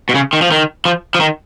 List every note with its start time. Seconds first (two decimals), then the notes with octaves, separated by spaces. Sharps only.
0.09 B2
0.15 C#3
0.33 D#3
0.42 F3
0.51 D#3
0.85 F3
1.15 F3
1.20 D#3